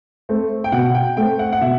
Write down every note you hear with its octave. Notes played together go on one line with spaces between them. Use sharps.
A3 C4
G5
B2 F#5
G5
A3 C4 G5
F#5
F#5
B2 E5